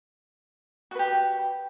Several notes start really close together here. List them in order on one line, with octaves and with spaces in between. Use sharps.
F#4 B4 G4